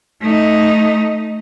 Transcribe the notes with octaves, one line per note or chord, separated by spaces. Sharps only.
A3 D#4